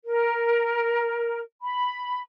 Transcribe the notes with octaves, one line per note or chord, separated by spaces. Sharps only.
A#4
B5